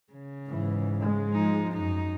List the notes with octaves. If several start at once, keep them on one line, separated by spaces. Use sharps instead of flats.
C#3
G#2 E3
G#3
F3 D#4
F#2 D#4